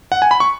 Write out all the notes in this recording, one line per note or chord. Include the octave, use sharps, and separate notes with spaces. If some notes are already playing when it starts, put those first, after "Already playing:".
F#5
G#5
B5
C#6